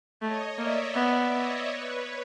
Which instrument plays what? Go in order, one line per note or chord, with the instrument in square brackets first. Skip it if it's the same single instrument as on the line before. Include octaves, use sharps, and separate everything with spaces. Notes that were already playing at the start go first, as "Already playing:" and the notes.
[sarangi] A3 [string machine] C#5 D#5
[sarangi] A#3 [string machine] D5 E5
[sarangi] B3 [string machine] D5 E5
[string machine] C#5 D#5
B4 C#5